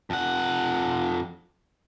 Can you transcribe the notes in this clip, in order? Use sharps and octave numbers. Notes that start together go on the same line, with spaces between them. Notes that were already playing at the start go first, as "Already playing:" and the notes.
F2 F#5